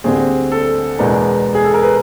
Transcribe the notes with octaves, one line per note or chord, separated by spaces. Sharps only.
D2 D3 G3 C4 G#4
A4
E2 B2 G#3 B3 D4 A#4
G#4
A4
A#4
B4